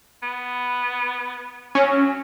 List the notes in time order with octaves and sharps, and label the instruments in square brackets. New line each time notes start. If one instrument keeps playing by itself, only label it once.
[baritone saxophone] B3
[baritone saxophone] F#3 [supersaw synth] C#4